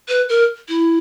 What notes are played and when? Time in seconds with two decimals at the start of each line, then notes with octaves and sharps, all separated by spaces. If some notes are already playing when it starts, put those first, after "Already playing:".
0.08 B4
0.29 A#4
0.68 E4